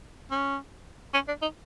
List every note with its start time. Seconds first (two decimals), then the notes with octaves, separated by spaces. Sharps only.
0.31 C#4
1.14 C#4
1.28 D4
1.42 D#4